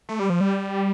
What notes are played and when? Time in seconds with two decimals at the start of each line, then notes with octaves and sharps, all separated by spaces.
0.09 A3
0.19 G3
0.30 F3
0.41 G3